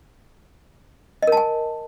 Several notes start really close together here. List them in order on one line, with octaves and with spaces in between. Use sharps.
D#5 A#4 A5 G#5